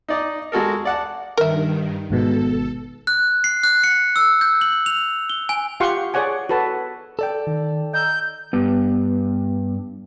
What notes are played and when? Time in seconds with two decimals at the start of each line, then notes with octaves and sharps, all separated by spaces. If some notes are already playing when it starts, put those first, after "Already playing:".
0.09 D#4 D5 D#5
0.52 G#3 F#4 A4 A#4
0.85 D5 F#5 A5
1.37 G2 D#3 A#4 E5
2.10 G#1 G#2 B2 A4
3.07 F#6
3.44 C7
3.63 F#6
3.84 C#7
4.16 E6
4.41 G6
4.61 F#7
4.86 F7
5.30 G7
5.49 G#5
5.80 F4 G4 F5 F#5 C6 C#6
6.14 G#4 C#5 D5 F#5 G#5
6.49 F#4 A4 B4 A5
7.19 A4 D5 G5
7.47 D#3
7.93 D#5 A#5 E6 G6
8.53 G2 B3